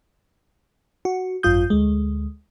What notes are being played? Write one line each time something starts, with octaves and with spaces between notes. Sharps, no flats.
F#4
G#1 F#2 F4 D#6 G6
D2 G#3